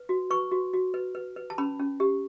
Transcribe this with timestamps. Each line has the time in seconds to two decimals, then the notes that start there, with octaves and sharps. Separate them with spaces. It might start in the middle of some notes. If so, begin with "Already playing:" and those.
Already playing: B4
0.09 F#4
0.31 B4 C#6
0.51 F#4
0.74 F#4
0.94 B4
1.15 B4
1.36 B4
1.50 A5
1.58 C#4 B5
1.79 C#4
2.00 G4